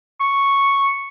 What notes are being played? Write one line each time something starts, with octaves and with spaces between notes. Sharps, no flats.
C#6